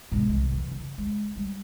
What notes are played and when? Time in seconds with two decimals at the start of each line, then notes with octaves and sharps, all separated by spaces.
0.12 G#2 B2
0.28 C2 E3
0.52 E3
0.72 C#3
0.98 G#3
1.36 G3